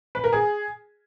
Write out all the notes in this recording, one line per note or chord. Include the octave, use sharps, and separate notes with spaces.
B4
A#4
G#4